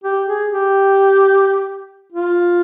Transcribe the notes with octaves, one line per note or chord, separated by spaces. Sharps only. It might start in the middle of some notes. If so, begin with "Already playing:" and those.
G4
G#4
G4
F4